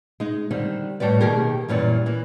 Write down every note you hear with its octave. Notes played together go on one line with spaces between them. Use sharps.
G#3 D#4
D3 D#3 G3 C4
A2 G3 F#4 B4 D5
B2 D#3 A#3 G4 G#4 A#4
F#2 A#2 E3 G3
E3 A#3